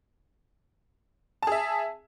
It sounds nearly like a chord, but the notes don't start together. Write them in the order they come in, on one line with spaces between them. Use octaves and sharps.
A5 G#4 E5